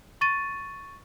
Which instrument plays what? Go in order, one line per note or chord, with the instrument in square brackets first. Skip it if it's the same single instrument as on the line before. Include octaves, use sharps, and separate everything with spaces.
[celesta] C#6 A6 D#7